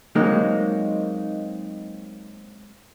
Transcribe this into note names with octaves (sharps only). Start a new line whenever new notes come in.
F#3 G#3 A#3 C4 D#4